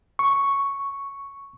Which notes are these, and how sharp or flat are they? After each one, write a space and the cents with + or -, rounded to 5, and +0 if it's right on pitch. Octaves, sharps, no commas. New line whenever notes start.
C#6 +0